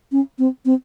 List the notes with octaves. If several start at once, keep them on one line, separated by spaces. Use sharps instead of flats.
C#4
C4
C4